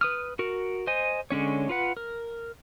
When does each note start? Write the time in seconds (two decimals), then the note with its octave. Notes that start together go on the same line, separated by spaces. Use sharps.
0.01 B4 D#6 F6
0.39 F#4 A#4
0.87 C5 D#5 G#5
1.31 D3 G#3 C#4 C#5
1.69 F4 B4 F#5
1.97 A#4